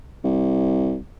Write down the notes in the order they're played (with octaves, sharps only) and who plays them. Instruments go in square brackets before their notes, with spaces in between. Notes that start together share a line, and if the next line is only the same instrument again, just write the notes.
[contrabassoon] C2